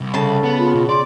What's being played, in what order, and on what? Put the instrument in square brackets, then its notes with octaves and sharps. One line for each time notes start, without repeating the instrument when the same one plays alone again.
[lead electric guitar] C2
[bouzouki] C#3 A5 [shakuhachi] A4
[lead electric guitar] B3
[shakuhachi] F4
[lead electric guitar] B2
[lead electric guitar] D5 [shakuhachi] C6